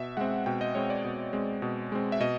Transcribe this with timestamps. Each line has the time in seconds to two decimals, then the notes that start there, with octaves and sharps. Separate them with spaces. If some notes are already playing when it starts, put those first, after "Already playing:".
Already playing: B2 E5
0.17 G#3 C4 F#5
0.46 B2 G5
0.61 D#5
0.75 G#3 C4 C#5
0.90 D5
1.05 B2
1.33 G#3 C4
1.62 B2
1.92 G#3 C4
2.12 E5
2.20 B2 D#5